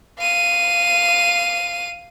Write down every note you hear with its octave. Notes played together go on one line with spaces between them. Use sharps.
F5 D#7